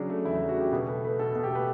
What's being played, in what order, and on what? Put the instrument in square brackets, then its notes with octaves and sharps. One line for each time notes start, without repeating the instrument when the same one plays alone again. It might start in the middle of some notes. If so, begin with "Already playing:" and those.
Already playing: [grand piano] C#3 F#3 D4
A3
E2 E4
F#3
F#4
C#3 G4
B2 B4
A3 B4
A3 B4
B2 A4
B2
G4
A3 B4